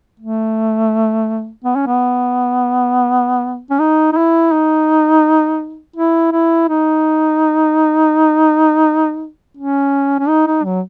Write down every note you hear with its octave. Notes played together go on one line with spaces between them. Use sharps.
A3
B3
C#4
B3
C#4
D#4
D#4
E4
D#4
E4
E4
D#4
C#4
C#4
D#4
D#4
F#3